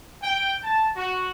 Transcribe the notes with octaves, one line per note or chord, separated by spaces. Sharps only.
G5
A5
F#4